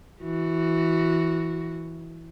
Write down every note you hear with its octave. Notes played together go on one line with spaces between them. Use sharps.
E3 F#4